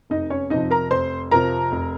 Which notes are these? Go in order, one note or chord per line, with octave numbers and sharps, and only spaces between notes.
F1 D#4 D#5
C#4 C#5
F2 C3 F3 D#4 D#5
A#4 A#5
F1 C5 C6
F2 C3 F3 A#4 A#5
F1